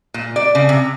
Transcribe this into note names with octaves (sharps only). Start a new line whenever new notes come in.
A#2
D5
C#3
C3